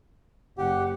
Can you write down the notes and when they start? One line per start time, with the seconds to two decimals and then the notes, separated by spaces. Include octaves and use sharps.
0.58 F#1 G4 F#5